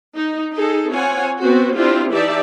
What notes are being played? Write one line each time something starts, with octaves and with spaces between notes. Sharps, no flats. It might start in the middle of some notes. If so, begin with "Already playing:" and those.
D#4
D#4 G#4 A4
C4 F4 C#5 F#5 G#5
B3 C4 F#4
C4 D4 E4 F4 G4
E3 D#4 G4 D5 E5 A5